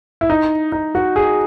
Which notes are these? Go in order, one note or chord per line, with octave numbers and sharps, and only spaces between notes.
E4
D#4
D#4
F#4
G#4